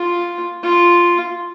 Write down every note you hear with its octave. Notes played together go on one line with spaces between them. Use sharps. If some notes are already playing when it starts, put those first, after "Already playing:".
Already playing: F4
F4